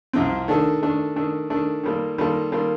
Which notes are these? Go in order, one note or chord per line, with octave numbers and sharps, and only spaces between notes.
C2 C3 F3 C4
D#3 A3 D4 A4
D#3 A3 D4 A4
D#3 A3 D4 A4
D#3 A3 D4 A4
D#3 G3 A#3 F4 A4
D#3 G3 A#3 F4 A4
D#3 G3 A#3 F4 A4